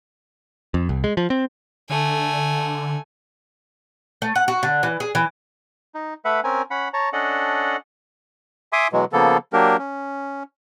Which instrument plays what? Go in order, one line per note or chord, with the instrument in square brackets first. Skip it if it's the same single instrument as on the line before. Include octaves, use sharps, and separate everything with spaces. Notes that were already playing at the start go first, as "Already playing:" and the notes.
[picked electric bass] F2
C2
G#3
F3
C4
[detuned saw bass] D3 [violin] A3 G#5
[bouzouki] A3
F#5
F#4
D3
E3
G#4
E3
[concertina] D#4
A3 B4 E5 F#5
C4 C#4 A#4 G#5
C#4 F#5 B5
C#5 A5 A#5
C#4 D4 A4 D#5 F#5
[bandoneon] E5 G#5 C6 D6 D#6
B2 E3 F#3 G#3
C#3 F3 A#3 B3 A4
F#3 A#3 D4 G4 A#4
C#4